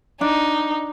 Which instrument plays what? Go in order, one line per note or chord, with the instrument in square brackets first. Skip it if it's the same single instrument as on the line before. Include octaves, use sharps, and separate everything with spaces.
[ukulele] D4 [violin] D#4